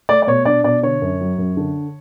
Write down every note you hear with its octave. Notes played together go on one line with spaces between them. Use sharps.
A3 D5
D5
B2 C#5
D4 D5
B2 D5
D3 C#5
F#2
F#3
F#2
D3